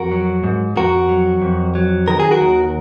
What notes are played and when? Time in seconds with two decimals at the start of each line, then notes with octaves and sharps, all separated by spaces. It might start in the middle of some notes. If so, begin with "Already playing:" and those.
Already playing: F2 F#4 A#4
0.12 F#3
0.44 G#2
0.76 F2 F#4 A#4
1.09 F#3
1.42 F2
1.75 F#3
2.08 D#3 A#4
2.20 G#4
2.31 F#4 A#4
2.41 D#2